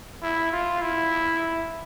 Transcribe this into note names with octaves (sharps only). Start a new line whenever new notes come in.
E4
F4
E4